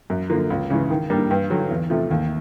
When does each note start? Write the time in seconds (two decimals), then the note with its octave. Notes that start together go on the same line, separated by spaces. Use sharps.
0.10 F#2
0.30 D3 F3 A#3
0.50 C#2
0.70 C#3 E3 G#3
0.90 D#3
1.10 G3 A#3 D4
1.30 G2
1.50 D3 F#3
1.71 E2
1.90 C3 F3 A3
2.11 D#2